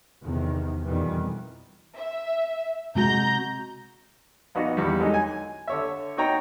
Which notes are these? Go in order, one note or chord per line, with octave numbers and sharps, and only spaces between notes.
E2 C3 D#3
F2 B2 D#3 E3 G3 B3
E5
C3 G#3 F#4 A#5 G6
A#1 B3 D#4 F#4
E2 G3
D3 F#3 G#3 D#4
G#5
D3 C#5 E5
D#4 F#4 C#5 G5 A#5